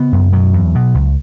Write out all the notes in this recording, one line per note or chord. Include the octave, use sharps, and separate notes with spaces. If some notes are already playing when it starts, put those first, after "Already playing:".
Already playing: C#3 B3
F#2
B2 F#3
E2
B2
C#2